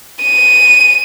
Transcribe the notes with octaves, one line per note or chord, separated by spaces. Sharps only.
D#7